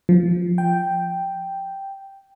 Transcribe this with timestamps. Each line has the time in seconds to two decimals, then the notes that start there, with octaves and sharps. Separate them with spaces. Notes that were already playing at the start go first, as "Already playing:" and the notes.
0.09 F3
0.58 G5